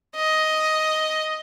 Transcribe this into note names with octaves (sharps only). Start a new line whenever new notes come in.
D#5